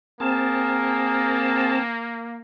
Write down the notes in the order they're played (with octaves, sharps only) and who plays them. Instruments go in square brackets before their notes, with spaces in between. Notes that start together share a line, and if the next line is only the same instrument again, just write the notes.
[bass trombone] A#3 [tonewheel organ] C4 A5 [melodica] G#4 A#4